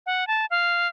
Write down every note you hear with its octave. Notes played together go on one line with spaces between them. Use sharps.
F#5
A5
F5